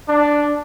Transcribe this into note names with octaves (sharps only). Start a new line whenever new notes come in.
D4